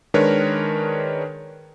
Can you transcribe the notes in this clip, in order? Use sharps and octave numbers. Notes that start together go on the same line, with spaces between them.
D#3 G#3 D4 A#4 B4 C#5